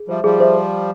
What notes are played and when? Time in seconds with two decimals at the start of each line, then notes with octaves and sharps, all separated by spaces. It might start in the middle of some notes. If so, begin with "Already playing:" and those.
Already playing: G#4
0.08 F3 G3 C5 E5
0.24 F3 G3 G#4
0.40 C5 E5